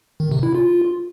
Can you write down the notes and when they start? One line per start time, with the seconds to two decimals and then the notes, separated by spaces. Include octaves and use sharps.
0.20 D#3
0.31 C3
0.43 E4
0.55 F4